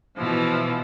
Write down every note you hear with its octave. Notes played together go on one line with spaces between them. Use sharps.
B2 E3 F3